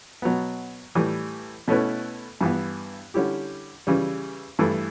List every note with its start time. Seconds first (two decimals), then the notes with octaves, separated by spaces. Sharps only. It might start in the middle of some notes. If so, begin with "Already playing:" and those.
0.22 B2 F#3 B3
0.95 A2 E3 G3
1.68 B2 A3 C#4 E4 B4
2.41 G2 E3 B3
3.14 D3 G3 C#4 E4 G4
3.87 C#3 E3 G3
4.59 G2 E3 A3 E4